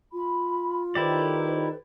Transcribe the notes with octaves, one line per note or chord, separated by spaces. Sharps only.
F4 B5
D#3 E4 G4 A4 B4 C5 D5